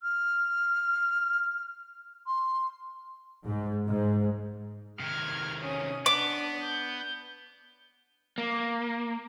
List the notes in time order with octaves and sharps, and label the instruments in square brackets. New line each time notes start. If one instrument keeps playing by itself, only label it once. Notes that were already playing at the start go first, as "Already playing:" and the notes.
[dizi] F6
C6
[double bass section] G#2
G#2
[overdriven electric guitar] C3 D#3 [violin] F6 G#6
[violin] C#4 D#6
[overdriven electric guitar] B3 [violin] D4 [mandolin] D6
[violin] G6
[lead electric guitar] A#3